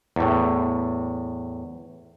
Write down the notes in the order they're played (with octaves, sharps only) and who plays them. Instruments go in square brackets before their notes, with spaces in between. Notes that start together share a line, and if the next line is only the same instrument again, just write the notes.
[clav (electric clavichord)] E2 A2